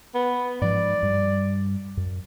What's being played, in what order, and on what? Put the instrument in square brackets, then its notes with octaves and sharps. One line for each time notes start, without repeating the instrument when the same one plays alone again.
[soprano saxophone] B3
[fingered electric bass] G#2 F3 [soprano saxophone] D5
[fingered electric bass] G2
F#2